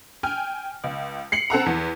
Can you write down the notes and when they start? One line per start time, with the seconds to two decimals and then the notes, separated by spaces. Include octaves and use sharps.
0.23 G5 G#5 F6
0.84 C#2
1.32 C7 C#7 F#7
1.50 C4 A4 F#5 A#5
1.66 E2